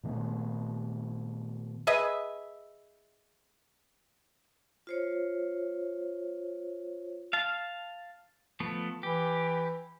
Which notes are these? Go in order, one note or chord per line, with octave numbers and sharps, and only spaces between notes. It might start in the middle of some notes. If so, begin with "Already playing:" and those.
A#2 D#3 A3 B3
G#4 B4 D#5 E5
F4 C5 C#5
F5 A5
F3 A3 B3
E3 G4